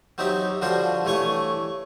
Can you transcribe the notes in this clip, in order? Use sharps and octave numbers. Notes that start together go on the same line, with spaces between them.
F#3 C4 D#4 G4 E5
D3 F3 G3 D4 F#4 C5
G2 E3 A3 C#5 G#5 C#6